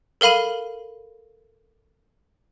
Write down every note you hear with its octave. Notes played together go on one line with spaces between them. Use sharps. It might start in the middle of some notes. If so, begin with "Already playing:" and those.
A4 A#4 F5 B5 D#7